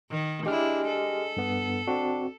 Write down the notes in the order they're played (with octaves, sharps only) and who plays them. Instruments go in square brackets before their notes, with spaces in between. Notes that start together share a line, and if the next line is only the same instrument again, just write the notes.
[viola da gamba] D#3
[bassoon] G#3 [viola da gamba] D4 E4 [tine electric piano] G4 F6
[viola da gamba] A4
[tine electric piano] G2 B3
[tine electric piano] C4 F#4 [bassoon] D4